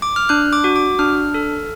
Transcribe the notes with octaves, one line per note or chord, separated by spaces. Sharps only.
D6
F6
D4 F#6
D6
F#4
D6
D4 F6
A4